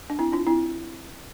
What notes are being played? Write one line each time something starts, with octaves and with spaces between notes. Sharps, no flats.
D4
C4 E4
D4 F4
C4 E4